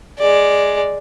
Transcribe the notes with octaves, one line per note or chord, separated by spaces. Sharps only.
G#3 D5